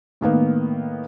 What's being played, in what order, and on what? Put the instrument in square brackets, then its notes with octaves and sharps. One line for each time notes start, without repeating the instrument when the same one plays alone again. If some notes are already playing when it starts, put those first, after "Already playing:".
[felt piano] A2 D#3 A#3 B3